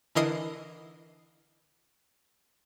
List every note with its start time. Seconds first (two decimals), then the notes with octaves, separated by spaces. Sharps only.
0.15 D3 E3 E4 A#4 D#5 C7